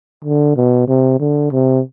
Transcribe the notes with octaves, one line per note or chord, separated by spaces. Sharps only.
D3
B2
C3
D3
C3